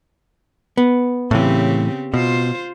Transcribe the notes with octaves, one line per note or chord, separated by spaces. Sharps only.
B3
A2 C#3 E3 C4 G4
B2 F4 C5